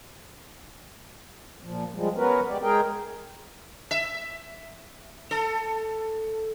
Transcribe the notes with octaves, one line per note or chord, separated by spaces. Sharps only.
A#2 F3
F3 G3 G#3
B3 C#4 F#4 A#4 B4
G#3 G4 D5
G#3 G#4 A#4 G5
E5
A4